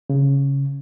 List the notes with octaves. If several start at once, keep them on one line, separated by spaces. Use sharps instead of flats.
C#3